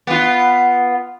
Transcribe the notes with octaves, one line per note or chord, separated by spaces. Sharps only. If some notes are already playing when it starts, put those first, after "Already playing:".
B3 F4